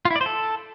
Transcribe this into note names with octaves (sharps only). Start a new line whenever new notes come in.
F4
E4
D5
C5
A4